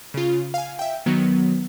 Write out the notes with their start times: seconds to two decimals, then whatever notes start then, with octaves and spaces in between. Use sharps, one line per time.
0.14 C#3 F4
0.54 F5 G#5
0.79 E5 G5
1.06 D#3 F#3 B3